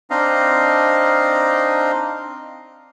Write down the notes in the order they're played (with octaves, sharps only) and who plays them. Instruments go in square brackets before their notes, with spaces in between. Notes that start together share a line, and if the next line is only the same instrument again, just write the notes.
[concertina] C4 D4 D#4 D#5 F5